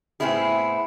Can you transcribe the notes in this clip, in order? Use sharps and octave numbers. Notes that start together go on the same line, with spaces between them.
A2 C3 B3 C4 E4 G#4